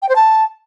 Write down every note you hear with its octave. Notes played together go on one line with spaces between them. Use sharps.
G5
C5
A5